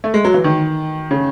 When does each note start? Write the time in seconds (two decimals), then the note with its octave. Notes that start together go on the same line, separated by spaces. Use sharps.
0.04 A3
0.14 G#3
0.25 F#3
0.34 E3
0.44 D#3
1.11 C#3